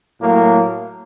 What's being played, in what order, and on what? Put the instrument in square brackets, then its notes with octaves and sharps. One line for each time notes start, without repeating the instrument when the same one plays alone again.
[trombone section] A2 F#3 A#3